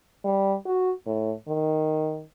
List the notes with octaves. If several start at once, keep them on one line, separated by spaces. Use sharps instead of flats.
G3
F#4
A2
D#3